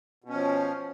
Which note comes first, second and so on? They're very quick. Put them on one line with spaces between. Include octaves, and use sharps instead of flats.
B2 C#4 F3